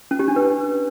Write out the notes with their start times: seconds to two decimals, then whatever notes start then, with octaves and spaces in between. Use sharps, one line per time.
0.11 C#4
0.19 G4
0.28 D4
0.36 B4